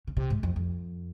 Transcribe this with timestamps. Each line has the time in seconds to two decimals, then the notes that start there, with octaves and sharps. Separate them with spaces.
0.07 C#3
0.17 C3
0.30 G#2
0.43 F2
0.56 F2